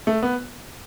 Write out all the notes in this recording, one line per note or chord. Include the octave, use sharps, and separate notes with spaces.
A3
B3